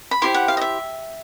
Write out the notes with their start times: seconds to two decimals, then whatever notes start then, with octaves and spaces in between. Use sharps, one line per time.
0.11 B5
0.22 E4 G4 C5 C6
0.34 F#5
0.48 F5
0.57 D#5
0.61 E5